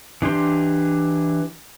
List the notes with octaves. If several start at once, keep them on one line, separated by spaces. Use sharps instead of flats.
E3 D4 G4 C6